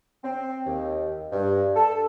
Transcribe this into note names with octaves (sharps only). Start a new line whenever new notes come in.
C4
D#2
G2
A4